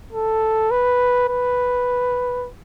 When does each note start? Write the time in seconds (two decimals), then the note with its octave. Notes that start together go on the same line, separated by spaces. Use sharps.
0.13 A4
0.71 B4
1.28 B4